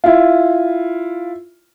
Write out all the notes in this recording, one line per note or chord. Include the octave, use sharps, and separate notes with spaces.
E4 F4